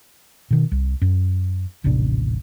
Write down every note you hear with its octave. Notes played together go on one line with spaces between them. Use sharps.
B2 D#3
C2
F#2
D#1 A1 C3 D4